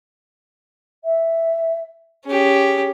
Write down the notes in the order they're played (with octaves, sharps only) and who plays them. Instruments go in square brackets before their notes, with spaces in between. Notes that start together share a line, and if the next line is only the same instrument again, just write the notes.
[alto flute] E5
[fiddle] C#4 G4 [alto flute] G#4